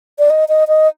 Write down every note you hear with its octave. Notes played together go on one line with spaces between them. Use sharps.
D5
D#5
D#5
D#5